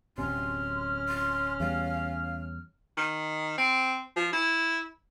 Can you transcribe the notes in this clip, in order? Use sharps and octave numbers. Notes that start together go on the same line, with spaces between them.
D1 G1 C3 C#4 C6 F6
C6
E2 G3 F5
D#3
C4
F3
E4